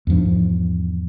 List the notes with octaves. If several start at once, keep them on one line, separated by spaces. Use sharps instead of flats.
E2 G#2 F3 D4